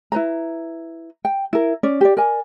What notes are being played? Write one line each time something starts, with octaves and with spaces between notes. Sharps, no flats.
E4 B4 C5 A#5
G5
E4 A#4
C#4 D5
G4 D5
A#4 D5 G#5